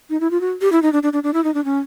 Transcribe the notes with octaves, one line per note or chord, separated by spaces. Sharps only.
D#4
E4
F4
F#4
G4
E4
D#4
D4
D4
D4
D4
E4
D#4
D4
C#4